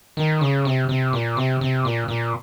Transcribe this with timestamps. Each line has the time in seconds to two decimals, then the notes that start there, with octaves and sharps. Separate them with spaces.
0.17 D#3
0.41 C#3
0.65 C3
0.89 C3
1.13 A#2
1.37 C3
1.61 C3
1.85 A#2
2.08 A#2